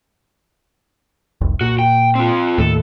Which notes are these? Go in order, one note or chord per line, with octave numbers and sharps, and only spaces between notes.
F1 C2
A#2 F#4
G5
C4 F4
D#2 A2 A4